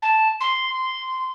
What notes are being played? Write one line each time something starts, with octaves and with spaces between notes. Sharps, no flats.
A5
C6